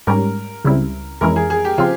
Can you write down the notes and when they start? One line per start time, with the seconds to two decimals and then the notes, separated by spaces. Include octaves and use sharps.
0.07 G#2 G3 C#4 A#4
0.65 C#2 C#3 G3 C4 E4
1.21 F2 E3 G#3 C#4 E4 A#4
1.36 G#4
1.50 G#4
1.65 G4
1.78 C#3 F3 C4 F4